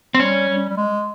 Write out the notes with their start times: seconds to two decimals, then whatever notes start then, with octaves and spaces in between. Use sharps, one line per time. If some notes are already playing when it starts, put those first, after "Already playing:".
0.14 C4
0.19 G3 C#4
0.49 G3
0.70 G3
0.78 G#3